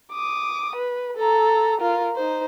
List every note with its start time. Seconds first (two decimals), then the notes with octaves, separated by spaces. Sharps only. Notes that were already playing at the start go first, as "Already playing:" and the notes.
0.12 D6 D#6
0.76 B4
1.17 A4 A#5
1.80 F4 A#4
2.16 D#4 C5